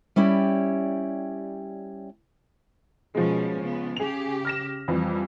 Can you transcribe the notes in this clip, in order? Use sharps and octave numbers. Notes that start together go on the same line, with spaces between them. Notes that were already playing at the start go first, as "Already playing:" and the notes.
G3 C#4 E4 G4 D5
B2 F3 G#3 B3 C#4
C#3 B3
C#3 G4 G#4 F7
F6 A#6 E7
F2 E3 G3